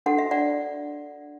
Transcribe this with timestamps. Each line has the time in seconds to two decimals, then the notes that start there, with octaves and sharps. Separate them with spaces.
0.06 D4 F#4 A4 F#5
0.18 E5
0.31 D5 F#5